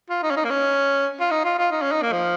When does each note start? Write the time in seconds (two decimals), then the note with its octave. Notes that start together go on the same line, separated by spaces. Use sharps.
0.10 F4
0.23 D#4
0.31 C#4
0.37 D#4
0.45 A#3
0.50 C#4
1.20 F4
1.31 D#4
1.44 F4
1.58 F4
1.72 D#4
1.82 C#4
1.92 D#4
2.02 A#3
2.12 F3